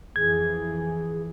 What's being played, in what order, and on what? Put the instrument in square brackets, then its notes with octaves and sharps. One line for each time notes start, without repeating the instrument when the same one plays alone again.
[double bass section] F2 E3 [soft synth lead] G#4 [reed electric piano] G#6